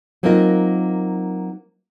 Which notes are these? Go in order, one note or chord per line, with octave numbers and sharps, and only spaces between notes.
F#3 A#3 C4 D#4 F4 A#4